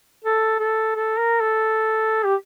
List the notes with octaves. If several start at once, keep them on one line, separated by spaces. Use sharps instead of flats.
A4
A4
A4
A#4
A4
G4